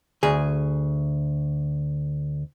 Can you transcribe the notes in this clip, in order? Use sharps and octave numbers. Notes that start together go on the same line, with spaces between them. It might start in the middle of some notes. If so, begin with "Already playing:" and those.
D2 G#4